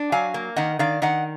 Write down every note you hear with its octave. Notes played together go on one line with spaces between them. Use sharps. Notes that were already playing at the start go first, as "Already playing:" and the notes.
Already playing: D4
F#3 F5 G#5
A#3
D#3 D#5 F#5
D#3 D5 F5
D#3 D#5 F#5